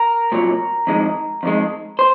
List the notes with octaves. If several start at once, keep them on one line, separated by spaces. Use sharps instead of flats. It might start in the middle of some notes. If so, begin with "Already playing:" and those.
Already playing: A#4
C2 A#2 F#3
F2 D#3 G#3
F2 D#3 G#3
C5